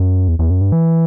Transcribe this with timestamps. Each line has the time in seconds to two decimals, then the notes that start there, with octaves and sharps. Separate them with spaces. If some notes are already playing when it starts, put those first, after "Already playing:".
Already playing: F#2
0.28 E2
0.39 E2
0.50 F#2
0.61 G2
0.72 E3